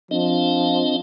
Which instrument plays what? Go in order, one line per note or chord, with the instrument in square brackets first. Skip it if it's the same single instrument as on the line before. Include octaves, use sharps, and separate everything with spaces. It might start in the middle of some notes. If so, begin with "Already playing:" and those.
[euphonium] F3 [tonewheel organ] C4 D4 D#5